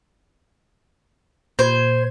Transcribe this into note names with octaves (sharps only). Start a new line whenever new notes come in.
A#2 C5 G#6